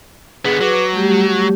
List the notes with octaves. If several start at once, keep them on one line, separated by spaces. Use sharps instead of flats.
D3 B3 G#4
F#3 B4 D6
G3 A3 G4